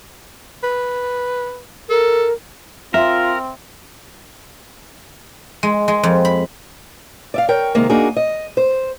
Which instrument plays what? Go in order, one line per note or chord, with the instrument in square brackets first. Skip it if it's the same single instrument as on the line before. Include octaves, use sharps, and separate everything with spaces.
[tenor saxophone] B4
[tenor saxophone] A4 [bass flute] A#4
[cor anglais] C4 [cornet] F4 [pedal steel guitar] A#4 [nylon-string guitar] E5
[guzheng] G#3
G#3
F2
B5
[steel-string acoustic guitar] D5 E5 F5
A#4 C#5 G5
C3 D#3 G#3 A#3
A#3 D4 D#4 F#4 G#4
D#5
C5